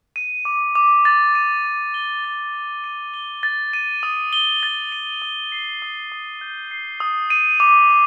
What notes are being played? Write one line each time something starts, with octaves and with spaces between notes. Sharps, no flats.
D#7
D6
D6
A6
D#7
D6
G7
A6
A6
D#7
G7
A6
D#7
D#6
G7
A6
D#7
D#6
C7
D#6
D#6
G6
C7
D#6
D#7
D6
D6